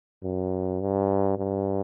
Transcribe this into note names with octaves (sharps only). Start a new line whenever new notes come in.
F#2
G2
G2